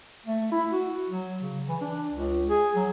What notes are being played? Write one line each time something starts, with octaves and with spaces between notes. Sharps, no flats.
A3
E4
F#4
F#3
C#3
E3
D4
C#2
G#4
F#3